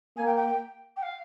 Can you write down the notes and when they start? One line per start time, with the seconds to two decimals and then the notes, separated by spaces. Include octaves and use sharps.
0.17 A#3 G#5
0.26 G5
0.36 G5
0.96 G5
1.02 F5